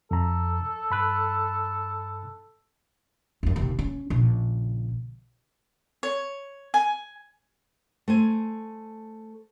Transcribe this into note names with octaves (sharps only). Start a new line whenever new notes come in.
F2 A4 A#5
G2 B5 F#6
F#1 F#2
D#2 C3
C#4
A#1 C#3
C#5
G#5
A3 C5 G#5